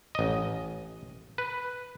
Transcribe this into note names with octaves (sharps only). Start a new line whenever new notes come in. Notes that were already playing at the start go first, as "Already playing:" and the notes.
A1 D#5
B4